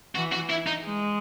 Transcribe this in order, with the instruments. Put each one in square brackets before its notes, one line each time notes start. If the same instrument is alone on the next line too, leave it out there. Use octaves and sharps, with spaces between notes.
[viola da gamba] E3 [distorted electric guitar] F#4
[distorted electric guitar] F#4
E4
D#4
[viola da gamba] G#3